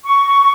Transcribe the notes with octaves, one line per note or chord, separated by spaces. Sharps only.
C#6